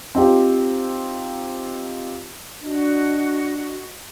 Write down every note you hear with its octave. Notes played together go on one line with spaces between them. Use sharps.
C4 D#4 F4 G4 C5
D4 F#4 D#5